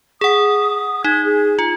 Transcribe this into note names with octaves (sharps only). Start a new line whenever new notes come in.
G#4 F#5 D#6
D#4 G#6
G#4
F4